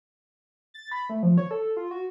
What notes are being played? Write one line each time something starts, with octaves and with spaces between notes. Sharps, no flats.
A6
B5
A3
F3
C#5
A4
F4
F#4